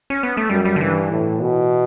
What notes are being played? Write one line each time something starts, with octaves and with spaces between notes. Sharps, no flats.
C#4
B3
A3
F#2 G3
G3
D3
G2 E3
A2
B2